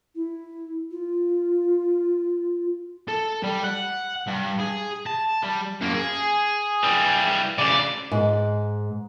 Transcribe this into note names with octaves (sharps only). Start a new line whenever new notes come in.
E4
F4
A4
G3
F#5
G2
G#4
A5
G3
F#2 A#3
G#4
E3 G3
D2 C#3 D5
G#2